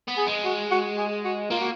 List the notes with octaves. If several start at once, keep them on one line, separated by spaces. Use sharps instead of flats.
B3
G#4
G#3
F#4
F#4
G#4
F#4
A#3 F4
F#4